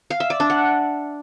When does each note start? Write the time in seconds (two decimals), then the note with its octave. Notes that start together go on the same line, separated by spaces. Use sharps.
0.10 F5
0.20 E5
0.30 D5
0.40 D4
0.50 F#5